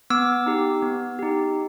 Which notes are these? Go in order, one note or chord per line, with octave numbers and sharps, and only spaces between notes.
B3 D6 E6
D#4 G4
B3
D#4 G4